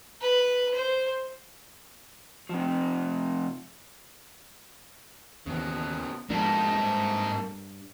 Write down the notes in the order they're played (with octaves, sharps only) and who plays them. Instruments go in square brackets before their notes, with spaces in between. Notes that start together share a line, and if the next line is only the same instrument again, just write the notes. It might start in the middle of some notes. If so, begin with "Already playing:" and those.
[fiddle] B4
C5
[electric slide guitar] C3 F3
[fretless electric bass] D#2 E3 [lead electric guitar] C#3 B3
[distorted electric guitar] G#2 [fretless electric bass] B2 F3 D4 [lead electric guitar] A#3 A4
[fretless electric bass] G2